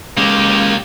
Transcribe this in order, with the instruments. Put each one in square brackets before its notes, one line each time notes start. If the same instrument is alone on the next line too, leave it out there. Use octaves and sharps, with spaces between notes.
[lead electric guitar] G#3 C#4 [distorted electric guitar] A#3 G4